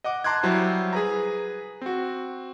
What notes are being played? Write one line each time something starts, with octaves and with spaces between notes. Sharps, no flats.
D#5 F#5 D6
A5 A#5 C6 D6 F#6 G#6
F#3 G3 E4 C5
G#4 B4 A#5
C4 F#4